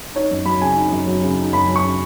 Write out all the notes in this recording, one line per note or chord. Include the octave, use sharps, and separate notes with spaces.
D#4 C#5
F#2
F#3 B5
C#3 G#5
D#4
F#2
F#3
C#3
D#4
F#2 B5
F#3
C#6
C#3